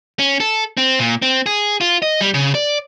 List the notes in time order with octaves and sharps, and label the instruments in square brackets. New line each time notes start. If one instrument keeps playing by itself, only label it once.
[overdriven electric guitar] C#4
A4
C4
A#2
C4
G#4
F4
D#5
G3
C#3
D5